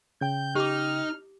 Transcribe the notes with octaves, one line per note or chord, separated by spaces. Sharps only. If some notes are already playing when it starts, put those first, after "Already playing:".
C#3 G5 G6
D#4 G4 D6 F6